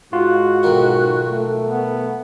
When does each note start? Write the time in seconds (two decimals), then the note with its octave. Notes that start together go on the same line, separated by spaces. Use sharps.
0.13 G#2 F4 F#4
0.63 B1 D#3
1.31 A3
1.65 B3